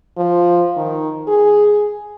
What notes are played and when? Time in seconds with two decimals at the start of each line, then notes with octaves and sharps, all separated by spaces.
0.17 F3
0.77 D#3
1.28 G#4